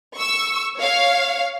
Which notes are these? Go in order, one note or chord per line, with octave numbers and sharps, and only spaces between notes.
C#6 E6
C#5 F5